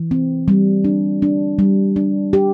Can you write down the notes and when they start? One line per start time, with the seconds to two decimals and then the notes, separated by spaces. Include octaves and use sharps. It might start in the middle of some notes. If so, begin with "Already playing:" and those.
Already playing: E3
0.11 C4
0.48 G3
0.85 D4
1.22 D4
1.59 G3
1.96 D4
2.33 G4